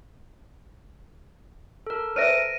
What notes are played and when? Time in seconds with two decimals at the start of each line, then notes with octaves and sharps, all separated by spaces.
1.87 A4 A#4
2.16 B4 C5 E5 A#6 D7 D#7